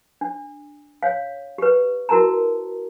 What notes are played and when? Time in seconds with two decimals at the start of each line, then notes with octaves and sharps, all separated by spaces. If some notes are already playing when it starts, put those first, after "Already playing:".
0.21 D4
1.03 C#5 F5
1.58 G4 B4
2.09 E4 F#4 A#4 A5 A#5